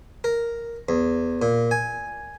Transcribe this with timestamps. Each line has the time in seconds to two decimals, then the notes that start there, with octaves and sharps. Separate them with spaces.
0.24 A#4
0.89 E2
1.42 A#2
1.71 G#5